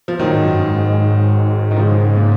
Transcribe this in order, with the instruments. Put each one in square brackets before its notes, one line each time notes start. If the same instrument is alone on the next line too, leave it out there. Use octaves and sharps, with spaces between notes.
[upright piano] F3
[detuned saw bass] A#2 [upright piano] D#3 F#3
[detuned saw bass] G#2
F#2
G#2
[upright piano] D#3
C#3 F3
A#2 C#3